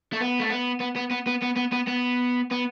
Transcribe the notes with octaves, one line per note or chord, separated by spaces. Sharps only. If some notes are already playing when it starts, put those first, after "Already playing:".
A3
B3
A3
B3
B3
B3
B3
B3
B3
B3
B3
B3
B3